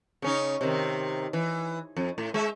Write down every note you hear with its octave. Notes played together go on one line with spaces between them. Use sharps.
C#3 C#4 D#4
C3 D#3
E3
F2
A2
G#3 E5